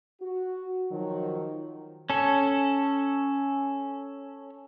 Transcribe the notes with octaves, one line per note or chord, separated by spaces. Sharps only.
F#4
D#3 F3 F#3
C#4 A4